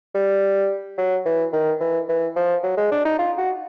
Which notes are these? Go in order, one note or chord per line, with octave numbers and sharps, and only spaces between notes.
G3
F#3
E3
D#3
E3
E3
F3
F#3
G#3
D4
D#4
F4
F#4